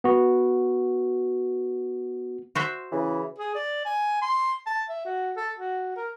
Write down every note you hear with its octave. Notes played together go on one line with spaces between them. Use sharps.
B3 F#4
F#4 C5 E5
C#3 E3
G#4
D5
G#5
C6
A5
E5
F#4
A4
F#4
A#4